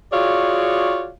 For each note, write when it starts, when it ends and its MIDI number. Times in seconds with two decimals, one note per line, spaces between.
0.13 1.10 65
0.13 1.10 66
0.13 1.10 68
0.13 1.10 73
0.13 1.10 74
0.13 1.10 77